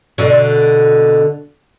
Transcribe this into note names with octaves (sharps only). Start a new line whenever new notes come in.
B2 D3